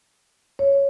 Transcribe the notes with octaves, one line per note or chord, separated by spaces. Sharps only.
C#5